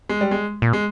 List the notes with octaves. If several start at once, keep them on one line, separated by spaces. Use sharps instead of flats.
G#3
G3
G#3
A#2
G#3